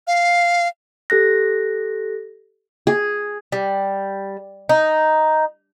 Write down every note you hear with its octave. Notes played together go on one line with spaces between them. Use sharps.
F5
G4 A4 F#6 A#6
G#4
G3
D#4